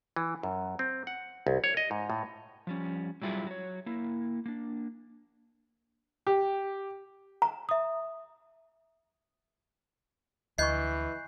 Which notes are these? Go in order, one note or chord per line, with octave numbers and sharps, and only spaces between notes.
E3
F#2
C4
F#5
C2
C#5
D#5
G#2
A2
F3 G3 C#4
F#3 G3 E4 F4 G#4 E5
F#3 C#5
A#3 E4
A#3 D4
G4
A#5
E5 D#6
D2 E3 D#5 B5 C#6 F#6 G6 C7